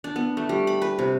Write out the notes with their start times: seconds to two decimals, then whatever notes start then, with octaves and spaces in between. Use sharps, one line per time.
0.04 D4
0.16 B3
0.37 A3
0.49 G3
0.67 B5
0.82 B4
0.99 C3